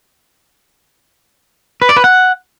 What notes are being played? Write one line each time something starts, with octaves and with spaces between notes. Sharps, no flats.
B4
D5
B4
F#5